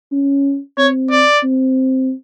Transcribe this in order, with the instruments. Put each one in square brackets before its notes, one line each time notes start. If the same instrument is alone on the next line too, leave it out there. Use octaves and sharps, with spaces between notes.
[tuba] C#4
[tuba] C4 [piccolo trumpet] C#5
[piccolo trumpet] D5
[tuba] C4